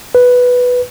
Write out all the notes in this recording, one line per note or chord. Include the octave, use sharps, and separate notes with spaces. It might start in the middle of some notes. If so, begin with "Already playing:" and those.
B4